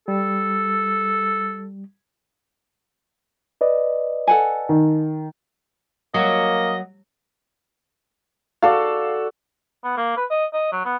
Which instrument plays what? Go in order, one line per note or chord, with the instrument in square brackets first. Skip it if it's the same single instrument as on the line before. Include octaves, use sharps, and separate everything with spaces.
[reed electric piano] G3 [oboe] A4
[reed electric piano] B4 D5 D#5
[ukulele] A4 F#5 G#5
[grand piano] D#3
[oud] F#3 [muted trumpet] A#3 [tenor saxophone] D#5
[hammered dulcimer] F#4 A4 D5 [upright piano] F5
[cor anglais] B3
A#3
B4
D#5
D#5
F#3
B3